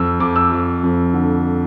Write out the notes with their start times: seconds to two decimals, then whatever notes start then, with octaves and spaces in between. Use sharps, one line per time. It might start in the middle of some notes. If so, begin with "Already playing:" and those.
Already playing: F2 E6
0.20 F2 D6
0.36 E6
0.52 F2
0.84 F2
1.14 D3